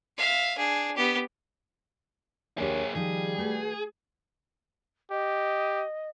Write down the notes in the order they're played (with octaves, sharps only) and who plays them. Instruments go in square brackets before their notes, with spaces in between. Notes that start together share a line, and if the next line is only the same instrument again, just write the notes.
[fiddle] E5 F5
D4 G#4
B3 G4
[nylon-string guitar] D#2 D4 G4 [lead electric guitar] A#3 G#4 [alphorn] C#5
[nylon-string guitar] D#3 F3 D#4 [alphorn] G3 [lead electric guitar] G#4
[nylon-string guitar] A3 F#4 B4
[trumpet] G4 [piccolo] D#5